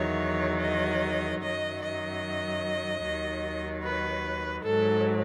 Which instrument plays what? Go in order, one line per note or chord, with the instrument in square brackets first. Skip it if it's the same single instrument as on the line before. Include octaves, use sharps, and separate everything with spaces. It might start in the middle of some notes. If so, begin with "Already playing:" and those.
Already playing: [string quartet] E2 D#3 F#3 C#5
D#5
F#2 D#3 F#3 D#5
D#5
D#2 D#3 F#3
B4
G#2 F#3 A4